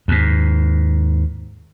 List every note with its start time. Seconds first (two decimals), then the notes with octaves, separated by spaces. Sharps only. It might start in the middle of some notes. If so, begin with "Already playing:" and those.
0.08 D#2 G#2